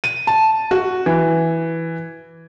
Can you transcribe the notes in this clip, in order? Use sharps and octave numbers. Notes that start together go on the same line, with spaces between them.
D#7
A5
F#4
E3